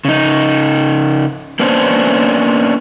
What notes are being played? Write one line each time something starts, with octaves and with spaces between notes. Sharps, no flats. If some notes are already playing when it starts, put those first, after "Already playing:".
C#3 D#4
A#3 B3 C#4 D4 C5